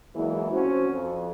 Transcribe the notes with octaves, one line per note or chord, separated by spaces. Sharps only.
E2 E3 F#3 G#3 A#3 E4
F3 C4 C#4 F#4
F2 F3